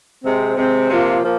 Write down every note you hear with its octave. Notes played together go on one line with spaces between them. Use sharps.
C3 G#3 C4
C3 G#3 C4
C3 F3 A#3 F4
F3 A#3